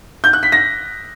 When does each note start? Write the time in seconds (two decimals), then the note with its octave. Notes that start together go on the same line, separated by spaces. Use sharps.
0.24 G6
0.33 F#6
0.43 B6
0.52 A#6